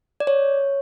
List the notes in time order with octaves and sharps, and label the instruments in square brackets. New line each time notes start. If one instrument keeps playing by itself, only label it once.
[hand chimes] D5
C#5